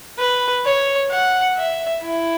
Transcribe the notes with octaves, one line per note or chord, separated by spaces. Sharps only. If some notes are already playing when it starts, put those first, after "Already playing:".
B4
C#5
F#5
E5
E4